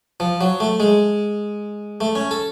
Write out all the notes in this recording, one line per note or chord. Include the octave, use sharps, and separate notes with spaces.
F3
F#3
A3
G#3
A3
C#4
A4